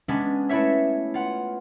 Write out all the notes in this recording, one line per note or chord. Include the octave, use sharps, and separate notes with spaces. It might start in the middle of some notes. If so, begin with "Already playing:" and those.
G#3 B3 C#4 D4 D#5
A3 E4 B4 C#5 E5
F4 F#5